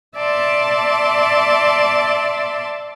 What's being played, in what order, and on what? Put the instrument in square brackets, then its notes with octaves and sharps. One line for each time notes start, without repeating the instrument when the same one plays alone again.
[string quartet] D5 E5 A5 C6